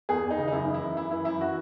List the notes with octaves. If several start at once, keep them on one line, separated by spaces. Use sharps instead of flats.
E2 G#4
E2
D#4
C#3
D#4
F#2 E4
E3
E4
F#2
F#2 E4
E3 E4
F#2 E4
F#4